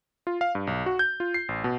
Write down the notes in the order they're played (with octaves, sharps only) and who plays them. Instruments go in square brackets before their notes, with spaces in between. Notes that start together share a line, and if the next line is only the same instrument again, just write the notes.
[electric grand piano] F4
F5
G2
B1
F#4
G6
F4
C7
A1
B2